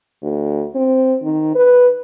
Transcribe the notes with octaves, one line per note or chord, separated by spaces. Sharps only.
D2
C4
D#3
B4